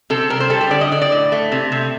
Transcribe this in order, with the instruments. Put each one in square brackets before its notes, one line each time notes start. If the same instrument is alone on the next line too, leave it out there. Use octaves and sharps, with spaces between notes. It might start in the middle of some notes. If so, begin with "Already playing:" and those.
[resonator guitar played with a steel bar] C3 A4
G3 A#4
C5
G3 A4
G4
D3 D5
D#5
D3 D5
D5
A2
A3
C3
C3